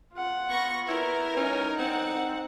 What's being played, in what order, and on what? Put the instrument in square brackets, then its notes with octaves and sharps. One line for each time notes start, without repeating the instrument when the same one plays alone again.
[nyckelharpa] F4 F#5
[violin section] B3 C#6 A#6
[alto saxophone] E4 [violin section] A#4 [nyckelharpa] B4
[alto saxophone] C#4 [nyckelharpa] D#4
[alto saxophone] C4 [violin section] F#5